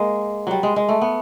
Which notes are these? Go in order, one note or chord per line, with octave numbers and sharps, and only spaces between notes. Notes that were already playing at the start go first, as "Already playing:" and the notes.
Already playing: G#3 A#3
F#3 G3
G#3
G#3
A3
B3